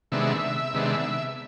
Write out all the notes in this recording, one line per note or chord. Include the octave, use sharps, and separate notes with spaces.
C3 D#3 G#3 B3 D4 E5
C3 D#3 G#3 B3 D4